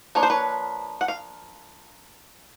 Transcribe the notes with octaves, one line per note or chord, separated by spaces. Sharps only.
F3 A#3 D4 C#5
C5
B4 C#5
F#5
F5